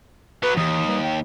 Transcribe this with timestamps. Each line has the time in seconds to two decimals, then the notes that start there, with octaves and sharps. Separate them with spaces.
0.43 F#3 B3 B4
0.57 D#2 E3 G4 D#6
0.88 G3 B4
1.04 G5